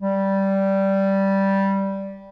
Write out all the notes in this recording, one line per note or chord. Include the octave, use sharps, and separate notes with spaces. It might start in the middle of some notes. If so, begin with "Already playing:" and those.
G3